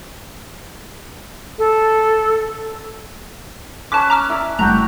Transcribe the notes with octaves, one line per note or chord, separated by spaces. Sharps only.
A4
C#4 B4 C#5 A5 D6
A#5 D6 F6
E4 D5 E6
F#1 G3 A3 D4 F#4 G5 A#5